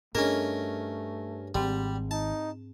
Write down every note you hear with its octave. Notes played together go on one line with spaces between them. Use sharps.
G2 A3 C#4 D4 G#4 A#4 D#5
G#1 G#2 G3 C4
D#4 A5